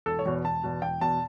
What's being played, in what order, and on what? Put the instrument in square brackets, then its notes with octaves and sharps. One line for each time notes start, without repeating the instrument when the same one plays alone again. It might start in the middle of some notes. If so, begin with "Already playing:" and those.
[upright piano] E1 A4
C#5
E2 B2
E1 A5
E2 B2
E1 G5
E2 B2 A5